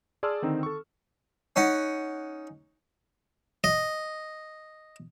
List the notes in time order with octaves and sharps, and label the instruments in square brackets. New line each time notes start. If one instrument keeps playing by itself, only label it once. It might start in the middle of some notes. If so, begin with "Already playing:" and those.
[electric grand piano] G#4 D5 A5 C6 E6 F6
D3 D#3 C4 D#4
A4 C#6
[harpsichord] C#4 D#4 F#5
D#5